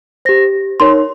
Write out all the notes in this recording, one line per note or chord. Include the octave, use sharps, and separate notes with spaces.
G4 C5 A#6
D#4 A#4 C#5 C6